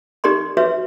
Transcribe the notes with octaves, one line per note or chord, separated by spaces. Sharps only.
D#4 G4 A#4 D5 C6
F#4 B4 C#5 E5